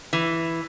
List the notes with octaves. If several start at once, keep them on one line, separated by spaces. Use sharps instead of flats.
E3